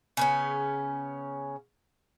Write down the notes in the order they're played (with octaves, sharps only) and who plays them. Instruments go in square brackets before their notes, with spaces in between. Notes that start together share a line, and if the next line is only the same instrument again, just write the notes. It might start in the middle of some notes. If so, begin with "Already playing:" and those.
[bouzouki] C#3 B3 C#4